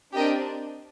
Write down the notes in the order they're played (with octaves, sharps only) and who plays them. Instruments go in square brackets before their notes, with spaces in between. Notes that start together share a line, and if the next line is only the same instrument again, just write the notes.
[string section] C4 D4 [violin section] G4 A#4 D#5 G5